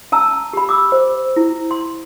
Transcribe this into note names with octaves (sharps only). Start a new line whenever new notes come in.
C#4 A5 A#5 E6
G4 B5
D6 E6
C5
E4
C6